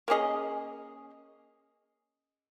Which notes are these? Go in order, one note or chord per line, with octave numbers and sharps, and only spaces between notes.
A#3 C#4 G#4 D#5